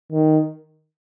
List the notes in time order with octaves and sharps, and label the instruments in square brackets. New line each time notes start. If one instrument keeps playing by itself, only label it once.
[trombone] D#3